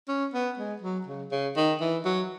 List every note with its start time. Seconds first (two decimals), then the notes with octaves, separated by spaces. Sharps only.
0.08 C#4
0.33 B3
0.57 G#3
0.81 F#3
1.07 C#3
1.31 C#3
1.56 D#3
1.80 E3
2.05 F#3